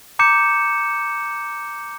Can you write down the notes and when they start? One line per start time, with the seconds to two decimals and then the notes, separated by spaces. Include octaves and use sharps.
0.19 A#5 D6 G6 C#7 E7